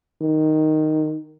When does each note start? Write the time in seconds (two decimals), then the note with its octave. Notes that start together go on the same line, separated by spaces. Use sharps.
0.21 D#3